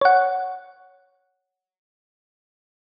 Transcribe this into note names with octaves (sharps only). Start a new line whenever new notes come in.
C#5 F#5